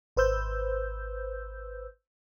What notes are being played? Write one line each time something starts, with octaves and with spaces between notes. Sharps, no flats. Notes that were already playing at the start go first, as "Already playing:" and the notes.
G#1 B4 C5 E6 G6